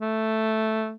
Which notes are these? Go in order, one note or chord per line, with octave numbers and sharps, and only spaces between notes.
A3